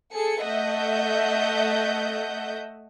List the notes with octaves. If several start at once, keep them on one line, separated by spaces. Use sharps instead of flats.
G#4 A4 C#7
A3 D#5 E5 F#5 G6